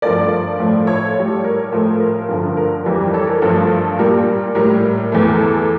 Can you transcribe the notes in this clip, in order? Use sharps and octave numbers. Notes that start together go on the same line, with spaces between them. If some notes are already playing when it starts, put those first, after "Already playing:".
G2 F3 A3 A#4 D5
A2 F3 A3
A4 C#5
A2 G3
A#4
A2 F3 A3
A#4
G2 D3 F3
A#4
F2 E3 G3
A4 C#5
A#4
G2 F3 A3 A4
A#2 G3 A#4
A2 G3 A#4
E2 E3 A3
A4